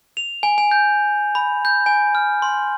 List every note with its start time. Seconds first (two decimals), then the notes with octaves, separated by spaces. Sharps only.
0.17 F7
0.43 G#5
0.58 G#5
0.71 G6
1.35 B5
1.65 G6
1.86 G#5
2.15 F6
2.42 C6